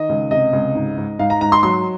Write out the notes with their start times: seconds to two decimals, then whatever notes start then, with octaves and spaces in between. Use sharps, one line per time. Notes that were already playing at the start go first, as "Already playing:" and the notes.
Already playing: D#3 D#5
0.09 C#2
0.31 C3 D#5
0.53 C#2
0.75 G#2
0.97 G#2
1.19 G#2 F5
1.30 A#5
1.41 G#2 A#5
1.52 C6
1.63 F#3 C6